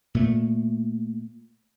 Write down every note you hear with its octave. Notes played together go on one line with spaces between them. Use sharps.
A#2 A3